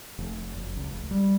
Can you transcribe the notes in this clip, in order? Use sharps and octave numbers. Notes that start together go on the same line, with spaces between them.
F1
F#1
C#2
F1
G3